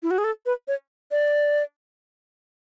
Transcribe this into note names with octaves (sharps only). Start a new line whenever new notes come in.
E4
F#4
G#4
A4
B4
C#5
D5